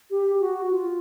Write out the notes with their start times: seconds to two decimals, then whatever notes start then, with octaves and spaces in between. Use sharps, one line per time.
0.10 G4
0.40 F#4
0.71 F4